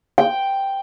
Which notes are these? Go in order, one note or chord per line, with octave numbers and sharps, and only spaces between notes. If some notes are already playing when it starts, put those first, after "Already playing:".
G5